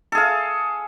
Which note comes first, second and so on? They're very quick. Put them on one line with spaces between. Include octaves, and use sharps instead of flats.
A4 G#4 F5